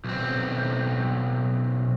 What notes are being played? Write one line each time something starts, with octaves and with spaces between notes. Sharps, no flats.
B1 C4